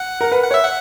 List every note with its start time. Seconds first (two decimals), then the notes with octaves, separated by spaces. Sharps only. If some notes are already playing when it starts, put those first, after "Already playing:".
Already playing: F#5
0.21 A#4
0.32 B4
0.43 F#5
0.51 C#5
0.54 E5
0.64 F#5